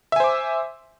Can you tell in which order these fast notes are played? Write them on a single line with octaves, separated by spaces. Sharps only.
E5 G#5 C5 D6